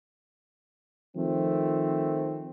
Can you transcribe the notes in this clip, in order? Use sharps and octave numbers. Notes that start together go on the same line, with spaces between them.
D#3 F3 A3 C4